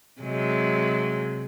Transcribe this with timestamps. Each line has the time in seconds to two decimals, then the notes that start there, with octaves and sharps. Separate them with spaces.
0.21 C3 F#3 G#3